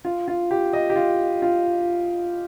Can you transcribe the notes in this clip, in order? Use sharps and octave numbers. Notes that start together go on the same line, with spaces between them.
F4
F4
G4
D#5
G4
F4
F4